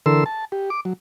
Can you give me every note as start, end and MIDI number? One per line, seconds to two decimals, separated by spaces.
0.06 0.24 50
0.06 0.24 52
0.06 0.24 69
0.06 0.24 70
0.06 0.24 84
0.06 0.24 88
0.26 0.45 81
0.52 0.70 67
0.70 0.80 86
0.85 0.93 54